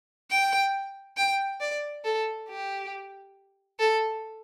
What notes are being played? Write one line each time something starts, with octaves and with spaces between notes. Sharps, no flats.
G5
G5
D5
A4
G4
A4